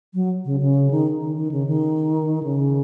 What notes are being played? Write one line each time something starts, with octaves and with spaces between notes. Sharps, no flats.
F#3
C#3
C#3
D#3
D#3
D#3
C#3
D#3
C#3